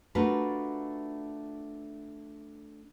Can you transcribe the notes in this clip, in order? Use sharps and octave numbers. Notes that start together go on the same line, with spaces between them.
A3 D4 F4 F#4 A#4 B4